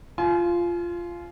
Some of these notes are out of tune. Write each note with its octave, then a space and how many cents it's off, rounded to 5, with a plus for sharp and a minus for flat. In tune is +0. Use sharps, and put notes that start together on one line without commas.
F4 -10 G#5 +35